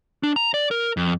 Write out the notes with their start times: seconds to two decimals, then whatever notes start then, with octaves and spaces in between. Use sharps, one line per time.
0.23 D4
0.36 A#5
0.54 D5
0.71 A#4
0.97 F2